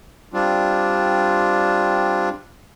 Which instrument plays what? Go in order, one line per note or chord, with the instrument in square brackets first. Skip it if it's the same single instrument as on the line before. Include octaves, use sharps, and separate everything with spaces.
[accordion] G3 C4 D4 F4